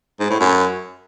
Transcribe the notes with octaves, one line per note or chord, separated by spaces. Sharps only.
G#2
A2
F#2